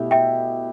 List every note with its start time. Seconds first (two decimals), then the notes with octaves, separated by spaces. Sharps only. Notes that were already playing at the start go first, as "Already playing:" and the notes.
Already playing: B2 A3 E4 G4 E5
0.11 E5 G5